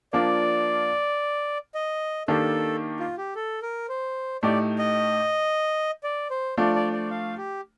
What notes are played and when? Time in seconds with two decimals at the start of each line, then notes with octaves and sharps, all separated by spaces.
0.13 F3 A#3 D4 F4 D5
1.75 D#5
2.28 D#3 A#3 D4 G4 A4
2.99 F4
3.18 G4
3.36 A4
3.62 A#4
3.89 C5
4.43 A2 A3 D#4 G4 D5
4.78 D#5
6.03 D5
6.30 C5
6.57 F3 A3 D4 F4 D5
6.75 D5
6.93 D5
7.11 F5
7.38 G4